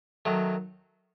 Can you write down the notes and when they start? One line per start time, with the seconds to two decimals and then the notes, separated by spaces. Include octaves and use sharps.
0.25 D#3 F#3 A3